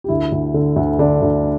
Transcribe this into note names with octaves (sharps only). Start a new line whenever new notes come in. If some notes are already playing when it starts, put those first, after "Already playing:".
G4
D2 E4
D2
D3
D2
D3 D4
D2